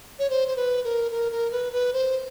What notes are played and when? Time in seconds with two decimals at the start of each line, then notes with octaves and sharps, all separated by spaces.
0.19 C#5
0.30 C5
0.48 C5
0.56 B4
0.84 A#4
1.11 A#4
1.32 A#4
1.52 B4
1.73 B4
1.93 C5